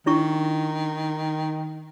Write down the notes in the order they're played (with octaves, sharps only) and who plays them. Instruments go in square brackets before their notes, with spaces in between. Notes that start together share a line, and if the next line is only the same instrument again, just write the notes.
[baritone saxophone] D#3 [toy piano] D4 E4 C#6